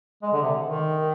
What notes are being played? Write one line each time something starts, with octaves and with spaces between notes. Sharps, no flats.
G#3
D3
C3
D#3